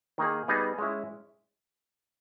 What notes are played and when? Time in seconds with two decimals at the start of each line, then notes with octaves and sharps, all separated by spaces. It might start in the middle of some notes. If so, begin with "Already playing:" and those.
0.18 D#3 A#3 D#4 G#4
0.48 G3 B3 D#4 G#4
0.78 G#3 C#4 E4